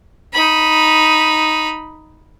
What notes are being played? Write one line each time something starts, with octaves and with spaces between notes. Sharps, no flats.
D#4 B5